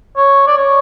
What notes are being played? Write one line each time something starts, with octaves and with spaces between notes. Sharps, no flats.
C#5
D5
C#5